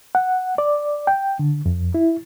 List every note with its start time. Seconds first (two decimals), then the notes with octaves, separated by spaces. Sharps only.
0.15 F#5
0.58 D5
1.07 G5
1.39 D3
1.66 F2
1.94 E4